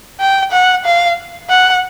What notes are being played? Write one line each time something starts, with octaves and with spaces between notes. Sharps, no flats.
G5
F#5
F5
F#5